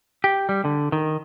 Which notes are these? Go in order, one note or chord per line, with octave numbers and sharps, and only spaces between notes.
G4
G3
D3
D#3